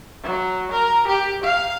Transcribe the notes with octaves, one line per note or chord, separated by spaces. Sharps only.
F#3
A#4
G4
F5